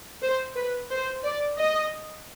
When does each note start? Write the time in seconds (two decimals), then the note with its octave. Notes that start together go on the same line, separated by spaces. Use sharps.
0.22 C5
0.55 B4
0.90 C5
1.24 D5
1.58 D#5